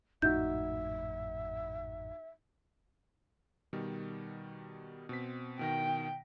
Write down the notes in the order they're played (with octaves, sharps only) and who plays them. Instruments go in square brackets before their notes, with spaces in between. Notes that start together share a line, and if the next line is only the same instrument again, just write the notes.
[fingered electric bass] G#1 F2 A2 [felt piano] D#4 F#4 [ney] E5 [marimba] G6
[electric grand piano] B2 D#3 G3
B2 C4 B6
[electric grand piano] B2 D#3 A#6 [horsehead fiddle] G5